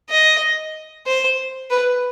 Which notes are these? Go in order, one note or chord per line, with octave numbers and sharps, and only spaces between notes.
D#5
C5
B4